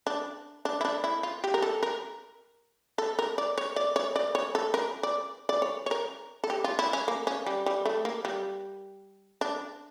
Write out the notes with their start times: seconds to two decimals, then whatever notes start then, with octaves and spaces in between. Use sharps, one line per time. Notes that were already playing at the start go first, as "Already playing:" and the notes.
0.07 D4
0.65 D4
0.81 E4
0.85 D4
1.04 E4
1.23 F4
1.44 G4
1.54 A#4
1.62 A4
1.83 A#4
2.98 A4
3.19 A#4
3.38 D5
3.58 C#5
3.76 D5
3.96 C#5
4.16 D5
4.35 C#5
4.55 A4
4.74 A#4
5.03 D5
5.49 D5
5.62 C#5
5.86 C#5
5.91 A#4
6.44 A4
6.50 G4
6.64 F4
6.79 E4
6.93 C#4
7.08 A#3
7.27 C#4
7.46 G3
7.66 G3
7.85 A3
8.05 A#3
8.25 G3
9.41 D4